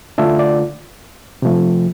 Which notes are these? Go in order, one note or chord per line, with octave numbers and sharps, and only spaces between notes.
D3 A3 D4 F4 E5
D5
C3 F3 A3